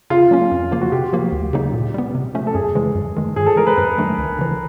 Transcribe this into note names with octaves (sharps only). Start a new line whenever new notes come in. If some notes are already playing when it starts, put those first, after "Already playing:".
C#3 F4
F#3 A#3 C#4
F2
C#3 F3 A#3
F#4
C3 G4
F3 A#3
D2
C#3 F#3 A#3 D#4
A#2
G3 B3
C3
F3 A3 C#4
A4
F#2 G#4
C#3 E3 G#3
F#2
D#3 G#3
G2 G#4
A4
E3 G#3 A#4
B4
F#2 B4
D#3 F#3 A3 D4
C#2
C#3 E3